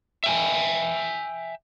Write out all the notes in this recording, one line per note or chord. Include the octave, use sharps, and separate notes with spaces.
E5 G5 G#5